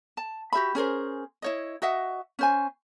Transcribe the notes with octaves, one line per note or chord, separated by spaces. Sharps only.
A5
F#4 G4 E5 B5
C#4 G#4 A#4 C5
E4 C#5 D#5
F#4 D#5 E5 F#5
C#4 C5 G#5